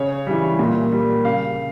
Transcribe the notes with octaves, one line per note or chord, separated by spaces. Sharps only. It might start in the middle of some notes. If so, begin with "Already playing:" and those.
Already playing: C#3 C#5
E3 G3
A#2
G3
C#3 F5